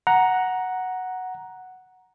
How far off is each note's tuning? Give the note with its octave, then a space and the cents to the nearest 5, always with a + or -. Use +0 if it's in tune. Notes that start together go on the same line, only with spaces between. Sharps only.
F#5 +0 A#5 +10